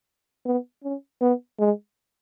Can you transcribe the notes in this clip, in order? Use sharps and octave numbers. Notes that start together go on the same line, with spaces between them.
B3
C#4
B3
G#3